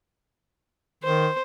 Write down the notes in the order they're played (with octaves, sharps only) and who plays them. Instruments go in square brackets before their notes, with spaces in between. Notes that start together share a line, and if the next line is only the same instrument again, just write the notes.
[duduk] D#3 [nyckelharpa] C5